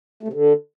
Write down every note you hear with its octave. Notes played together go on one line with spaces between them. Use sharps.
A3
C3
D3